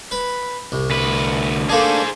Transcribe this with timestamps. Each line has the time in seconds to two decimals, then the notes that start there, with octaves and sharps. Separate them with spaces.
0.11 B4
0.72 C2
0.90 D2 B4
1.70 A3 A#3 D4 G#4 C5